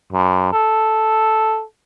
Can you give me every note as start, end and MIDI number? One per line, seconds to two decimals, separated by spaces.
0.13 0.51 42
0.52 1.63 69